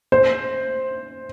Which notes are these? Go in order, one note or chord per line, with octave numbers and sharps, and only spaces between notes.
C5